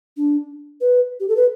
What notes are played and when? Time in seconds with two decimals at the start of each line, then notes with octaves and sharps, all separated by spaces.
0.17 D4
0.81 B4
1.20 G4
1.29 A4
1.36 B4